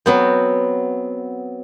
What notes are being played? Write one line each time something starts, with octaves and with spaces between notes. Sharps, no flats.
F#3 B3 C4